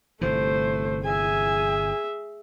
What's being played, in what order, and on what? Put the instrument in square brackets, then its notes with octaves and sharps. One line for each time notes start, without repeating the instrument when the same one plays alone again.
[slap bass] G1 C3 E3 [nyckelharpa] A3 [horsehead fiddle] C5
[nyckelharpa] G#4 E5 [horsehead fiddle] G#5